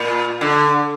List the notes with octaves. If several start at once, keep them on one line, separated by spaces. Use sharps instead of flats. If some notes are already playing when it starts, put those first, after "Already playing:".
Already playing: A#2
D3